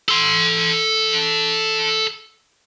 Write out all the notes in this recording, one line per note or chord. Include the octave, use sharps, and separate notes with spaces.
A4 C6